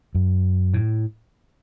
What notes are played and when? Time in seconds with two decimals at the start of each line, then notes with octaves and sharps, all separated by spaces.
0.15 F#2
0.74 A2